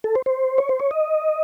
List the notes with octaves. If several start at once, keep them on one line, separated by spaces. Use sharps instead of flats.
A4
C5
C5
C#5
C5
C#5
D#5